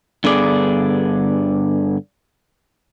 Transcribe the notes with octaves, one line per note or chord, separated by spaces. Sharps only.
G2 D3 B3 G#4 D5